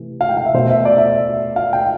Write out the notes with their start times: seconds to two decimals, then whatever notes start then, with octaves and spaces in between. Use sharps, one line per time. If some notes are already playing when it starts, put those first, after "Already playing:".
Already playing: C3 E3 A3
0.21 F5
0.29 G5
0.37 F5
0.46 E5
0.54 B2 A3 C5
0.71 E5
0.85 D5
0.98 E5
1.56 F5
1.73 G5